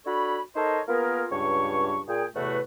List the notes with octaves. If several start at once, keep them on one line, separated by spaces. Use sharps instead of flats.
D4 F#4 A4 C#5 B5
D#4 A4 A#4 C5 C#5 D#5
A#3 B3 F4 G#4 A#4
C#2 G2 C#5 C#6
A#2 G#4 G5
E2 A2 C3 A3 F#4 B4